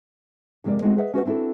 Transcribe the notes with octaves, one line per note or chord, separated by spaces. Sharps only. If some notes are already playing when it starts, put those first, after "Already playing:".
F2 C3 G#3 A#3 D5
G#3 A3 C4 D#4 F#4
G#4 B4 D#5 E5 F#5
C#4 F#4 B4 F#5
C4 D4 E4 F#4 A4